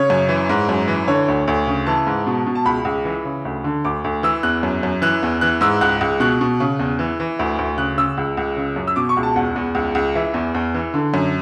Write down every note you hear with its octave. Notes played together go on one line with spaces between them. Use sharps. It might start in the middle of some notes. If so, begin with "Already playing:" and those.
Already playing: C#3 C#5
F#2
E3
G#2
F#2
E3
D3 C#5
D2
D2
C#3
E3 A5
G#2
B2
B2
A5
C#2 B5
C#2
E3
C#3
D2
D3
D2 D6
D2
E3 E6
E2 F#6
F#2
F#2
E3 F#6
E2
E3 F#6
G#2 E6
C#2 F#6
C#2
B2 F#6
B2
C#3
E2
E3
E3
D2
D2
C#3 F#6
C#3 E6
C#2
C#2
C#3
F#2
E6
B2 D6
C#6
C#2
A5
E2 F#5
E2
C#2
C#2
E3 E5
E2
E2
E3
D3
F#2